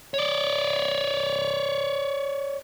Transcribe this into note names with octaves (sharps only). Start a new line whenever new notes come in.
C#5 D5